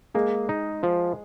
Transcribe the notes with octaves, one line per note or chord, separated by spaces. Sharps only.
G#3 A#3 G#4
D#4
F3